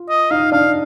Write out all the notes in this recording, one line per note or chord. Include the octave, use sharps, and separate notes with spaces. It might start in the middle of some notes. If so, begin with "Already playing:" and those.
Already playing: F4
D#5
D#4 D#5 F5
D4 D5 F5